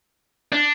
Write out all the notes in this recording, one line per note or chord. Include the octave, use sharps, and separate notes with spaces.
D4